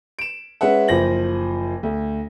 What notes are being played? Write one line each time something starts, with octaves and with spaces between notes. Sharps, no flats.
D7 E7
G#3 C#4 B4 E5 F#5
F#1 F3 C5 A#6 F#7
D2